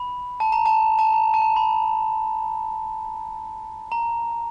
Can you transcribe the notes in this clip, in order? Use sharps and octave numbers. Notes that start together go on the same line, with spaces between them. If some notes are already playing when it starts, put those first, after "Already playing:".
Already playing: B5
A5
A#5
A5
A5
A#5
A5
A#5
B5
A#5